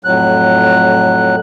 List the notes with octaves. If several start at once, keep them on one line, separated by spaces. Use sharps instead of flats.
F2 A2 F#3 F#6